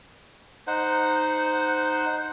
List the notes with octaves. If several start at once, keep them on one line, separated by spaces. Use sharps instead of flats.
D#4 C5 F#5